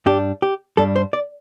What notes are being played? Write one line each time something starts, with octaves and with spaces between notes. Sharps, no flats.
G2 G3 D4 G4
G4
G2 G3 D4 A4
C5
D5